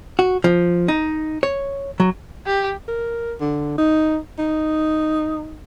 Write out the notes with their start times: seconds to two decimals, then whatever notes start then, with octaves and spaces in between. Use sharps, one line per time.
0.19 F#4
0.44 F3
0.88 D#4
1.43 C#5
2.00 F#3
2.46 G4
2.88 A#4
3.41 D3
3.78 D#4
4.39 D#4